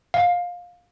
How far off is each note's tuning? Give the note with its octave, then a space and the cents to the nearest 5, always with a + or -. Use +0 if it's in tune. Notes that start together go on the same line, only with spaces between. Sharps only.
F5 +20